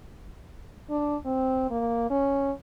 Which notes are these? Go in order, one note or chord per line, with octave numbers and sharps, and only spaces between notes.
D4
C4
A#3
C#4